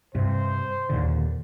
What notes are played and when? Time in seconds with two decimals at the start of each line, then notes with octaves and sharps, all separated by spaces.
0.15 G2 C3 C5
0.90 D#2 A#2 D3